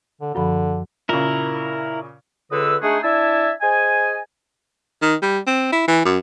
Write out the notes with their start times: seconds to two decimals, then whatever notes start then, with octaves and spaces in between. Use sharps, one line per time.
0.21 D3
0.35 F#2 D3 F3 B5
1.09 A#2 C#3 E4 A#4
2.51 C#2 D3 B4 D#5 D#6 E6
2.81 G#3 A3 D4 D#4 F#4 G#4
3.03 D4 E4 E5 G#5 A5 E6
3.61 G#4 C5 D#5 G#5
5.02 D#3
5.22 G3
5.47 C4
5.72 E4
5.88 E3
6.05 F#2